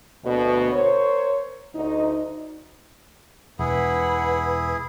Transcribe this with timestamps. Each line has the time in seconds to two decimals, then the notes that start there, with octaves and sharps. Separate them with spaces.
0.24 D2 B2
0.72 A#4 C5 C#5
1.74 D2 D#4
3.59 E1 E4 G#4 B4 F#5 B5